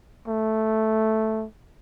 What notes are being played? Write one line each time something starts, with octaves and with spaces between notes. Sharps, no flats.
A3